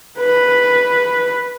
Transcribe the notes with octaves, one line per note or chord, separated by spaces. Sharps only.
B4